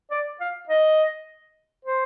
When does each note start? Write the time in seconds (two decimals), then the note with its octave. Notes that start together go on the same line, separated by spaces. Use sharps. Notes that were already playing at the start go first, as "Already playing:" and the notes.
0.11 D5
0.40 F5
0.69 D#5
1.85 C5